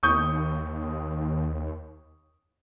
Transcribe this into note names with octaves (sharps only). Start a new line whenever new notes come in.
D#2 C#6 D#6 G6